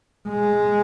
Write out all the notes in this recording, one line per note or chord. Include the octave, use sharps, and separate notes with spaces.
G#3